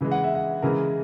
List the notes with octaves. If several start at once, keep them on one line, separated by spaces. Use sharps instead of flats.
C#3 E3 G#3
F#5
E5
F#5
C#3 E3 G#3 A#4